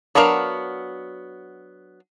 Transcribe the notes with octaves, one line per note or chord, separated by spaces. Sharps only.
F#3 B3 D4 A#4 F5